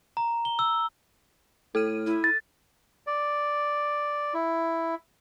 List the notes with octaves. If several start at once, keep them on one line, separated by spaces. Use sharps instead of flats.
A#5
G7
E6
A2 A4 F6 D#7
E4
A6
D5
E4